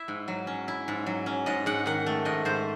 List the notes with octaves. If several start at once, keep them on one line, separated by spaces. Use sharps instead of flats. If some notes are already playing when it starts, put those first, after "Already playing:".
Already playing: E4 E5
G#2
F#3
C#4
E4
G#2
F#3
C#4
G#2 D#5
G#2 F#5
D#3 F#5
A3
G#2 D#5
G#2 C5